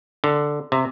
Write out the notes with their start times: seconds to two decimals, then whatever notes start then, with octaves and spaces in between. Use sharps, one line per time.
0.24 D3
0.72 C3